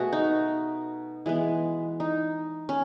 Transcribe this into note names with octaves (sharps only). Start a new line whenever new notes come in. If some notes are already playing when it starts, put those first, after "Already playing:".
Already playing: B2 A3 F#4 G#4
D#4
E3 G#3 B3
D#4
C#4